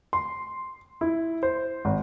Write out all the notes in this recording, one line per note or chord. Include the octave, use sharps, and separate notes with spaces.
C6
E4
C5
G#1